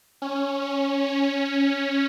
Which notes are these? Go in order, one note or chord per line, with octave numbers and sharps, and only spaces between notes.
C#4
C#4
C#4